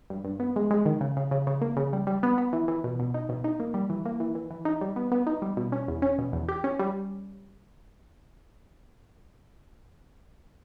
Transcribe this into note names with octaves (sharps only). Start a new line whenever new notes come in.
G2
G2
B3
G#3
G#3
D#3
C#3
C#3
C#3
C#3
A#3
C#3
G3
G3
B3
B3
E3
E3
B2
B2
D#4
B2
D#4
A#3
G3
E3
A#3
E3
E3
E3
D#4
G3
B3
B3
D#4
G3
B2
C#4
E2
C#4
B2
E2
G4
C#4
G3